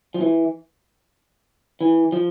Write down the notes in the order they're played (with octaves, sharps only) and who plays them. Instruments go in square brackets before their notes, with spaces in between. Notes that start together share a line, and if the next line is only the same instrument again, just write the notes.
[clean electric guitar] F3
E3
E3
F3